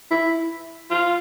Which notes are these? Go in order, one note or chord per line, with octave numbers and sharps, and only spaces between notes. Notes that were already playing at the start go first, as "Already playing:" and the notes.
E4
F4